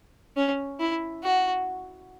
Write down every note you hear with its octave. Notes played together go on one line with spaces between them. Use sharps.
C#4
E4
F#4